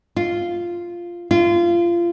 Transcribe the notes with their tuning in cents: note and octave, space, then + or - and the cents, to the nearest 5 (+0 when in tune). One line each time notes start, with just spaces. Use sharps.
F4 -5
F4 -25